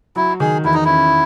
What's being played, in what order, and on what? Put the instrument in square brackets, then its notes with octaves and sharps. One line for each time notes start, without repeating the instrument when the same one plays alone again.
[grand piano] F#3 [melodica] E4
[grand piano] D#3 [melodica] G#4
[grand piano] E2 [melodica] E4
[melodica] D#4
[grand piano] C#4 [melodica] E4